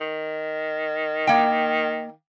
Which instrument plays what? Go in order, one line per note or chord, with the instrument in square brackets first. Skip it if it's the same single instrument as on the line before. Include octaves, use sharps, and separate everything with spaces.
[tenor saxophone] D#3
[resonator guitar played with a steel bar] A#3 G5